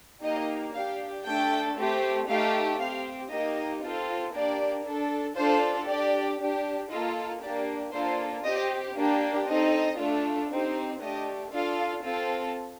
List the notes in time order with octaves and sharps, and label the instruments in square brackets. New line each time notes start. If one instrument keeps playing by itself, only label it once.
[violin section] A#3 D#4 G4 D#5
D4 G4 F5
A3 D4 A4 G5
A3 C4 G4
A3 D#4 G4 F5
C4 G4 F5
A#3 D#4 G4 D#5
C4 F4 A4
A#3 D4 G4 D5
D4 A4
D4 F4 A4 C5
D4 G4 D5
D4 G4
A#3 F4 A4 D#5
A#3 D4 G4 D5
A#3 D4 F4 A4 C5
C4 G4 D#5
A#3 D4 G4
C4 D#4 A4 D#5
A3 D4 F4 A4
C4 D#4 G4
A3 D4 G4 D#5
D4 F4 A4 F5
C4 F4 A4